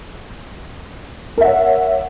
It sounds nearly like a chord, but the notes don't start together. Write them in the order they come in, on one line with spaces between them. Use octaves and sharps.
A#4 E5 F#5 C#5